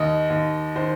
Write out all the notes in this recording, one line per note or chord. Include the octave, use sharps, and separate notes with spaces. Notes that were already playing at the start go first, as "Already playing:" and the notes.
Already playing: D#2 D#3 D#5
D#2
D#3 C5